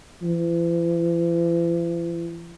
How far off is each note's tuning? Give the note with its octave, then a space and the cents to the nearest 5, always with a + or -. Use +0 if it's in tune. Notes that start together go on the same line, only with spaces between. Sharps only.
E3 +45